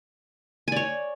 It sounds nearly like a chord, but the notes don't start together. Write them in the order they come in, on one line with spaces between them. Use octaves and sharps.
G#5 D5 C#5